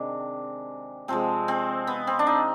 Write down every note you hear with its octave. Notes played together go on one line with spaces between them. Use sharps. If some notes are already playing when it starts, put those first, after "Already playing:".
Already playing: C3 D#3 G#3 D4
C3 F3 G#3 C4
C4
B3
C4
D4
D#4